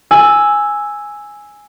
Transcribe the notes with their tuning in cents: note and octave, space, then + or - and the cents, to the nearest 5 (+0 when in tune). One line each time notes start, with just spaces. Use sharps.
G#5 +0 E6 +0